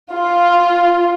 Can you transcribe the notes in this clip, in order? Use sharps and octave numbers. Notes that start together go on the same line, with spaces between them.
F4